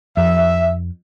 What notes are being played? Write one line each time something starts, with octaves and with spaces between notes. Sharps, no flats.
F2 E5